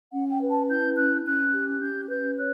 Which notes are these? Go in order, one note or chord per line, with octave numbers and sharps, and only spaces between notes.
C#4 F#5
G5
B4
A5
E4 G6
C#4 F#6
C#4 F#6
G4
C#4 G6
B4 G6
C#5 F#6